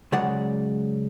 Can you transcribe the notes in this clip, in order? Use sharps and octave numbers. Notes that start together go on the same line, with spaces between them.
C#3 F#3 G#3 D5 F#5